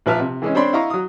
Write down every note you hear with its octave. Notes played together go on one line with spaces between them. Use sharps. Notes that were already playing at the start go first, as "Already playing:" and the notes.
A#1 F3 B4 E5 A5 F6
C3
E3 G#3 C#4
C4 D4 C#5 D5 B5 C6
E4 D#5 F5 A#5 C#6
F#3 D#6